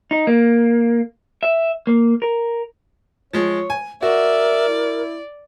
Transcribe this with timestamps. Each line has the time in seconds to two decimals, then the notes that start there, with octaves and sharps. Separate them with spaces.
0.11 D#4
0.27 A#3
1.43 E5
1.87 A#3
2.22 A#4
3.33 F3 G#3 C#5
3.70 G#5
4.03 F#4 A#4 D5 E5
4.68 E4